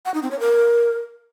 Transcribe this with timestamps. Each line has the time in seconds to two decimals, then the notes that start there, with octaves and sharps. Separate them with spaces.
0.06 F#5
0.14 D#4
0.23 C4
0.31 C#5
0.40 A#4